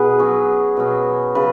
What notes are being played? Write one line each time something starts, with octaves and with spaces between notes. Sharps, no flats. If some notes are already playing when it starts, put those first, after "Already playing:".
Already playing: B2 B3 D#4 G#4 B4
F#3 C#4
B2 F#3 C#4
C#3 F#3 B4